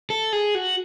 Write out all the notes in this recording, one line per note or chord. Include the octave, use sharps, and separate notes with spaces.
A4
G#4
F#4